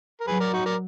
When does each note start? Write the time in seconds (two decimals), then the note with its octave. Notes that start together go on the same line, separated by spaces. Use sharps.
0.21 A#4
0.27 F#3 G#4 B4
0.40 A#4 D5
0.53 D#4 F#4
0.66 A#4 D5